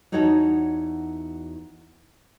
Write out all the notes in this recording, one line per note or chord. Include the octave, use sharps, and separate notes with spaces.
E2 D#4 F#4 C#5 F#5 A5